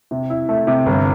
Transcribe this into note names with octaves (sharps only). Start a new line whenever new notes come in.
C3
E4
A3
C3
G1